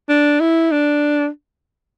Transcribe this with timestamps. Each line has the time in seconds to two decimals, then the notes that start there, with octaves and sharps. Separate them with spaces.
0.09 D4
0.40 E4
0.71 D4